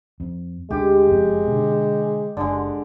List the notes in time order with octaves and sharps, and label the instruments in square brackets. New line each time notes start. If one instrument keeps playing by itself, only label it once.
[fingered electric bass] F2
[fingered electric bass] D2 D3 [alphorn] G#3 [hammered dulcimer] G4
[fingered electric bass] F#1 F2
B2 D3
[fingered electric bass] F#1 [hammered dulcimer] D3 G#3